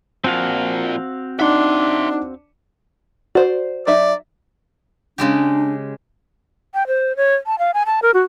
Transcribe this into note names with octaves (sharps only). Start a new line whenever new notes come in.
A#2 F3 C4 F#4 F5
D4 D#4 E5 F#5 C6
F#4 C5 D5
F#3 D#4 D5 E5
C#3 G#3 D4 G4
G5
C5
C#5
A5
F5
G#5
A5
A#4
F#4